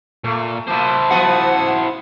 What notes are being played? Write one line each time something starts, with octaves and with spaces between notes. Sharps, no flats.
A#2 A3
B2 A#3 E4 C5 A5
F3 B3 F#4 F#5